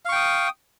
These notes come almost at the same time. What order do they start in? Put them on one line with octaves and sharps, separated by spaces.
F5 C#6 G5 D#6